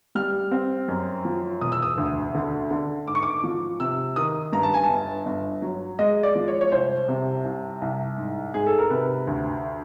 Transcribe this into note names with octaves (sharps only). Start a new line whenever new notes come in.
G3 F6
C4
F#2
F3
E1 D#6
E6
D#6
D2
D3
D3
G#2 D6
C#6
D6
F3
C3 E6
D#3 D#6
G2 A#5
A5
G#5
A5
G1
G1
F#3
G#3 D#5
D5
F3
C#5
C#5
C2 C5
C3
C2
C2
G#2
G#2 G#4
A4
A#4
C3 B4
D2